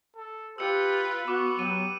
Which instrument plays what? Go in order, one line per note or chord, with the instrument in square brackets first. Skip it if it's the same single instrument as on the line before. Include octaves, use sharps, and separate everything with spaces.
[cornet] A4
[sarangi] F4 [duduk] G4 [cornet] B4 [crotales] E6 C#7
[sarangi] B3 [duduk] F#4 [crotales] D6
[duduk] F#3 [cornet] G4 [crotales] D#7